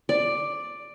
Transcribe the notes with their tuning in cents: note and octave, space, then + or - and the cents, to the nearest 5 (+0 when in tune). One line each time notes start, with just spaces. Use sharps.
D5 +5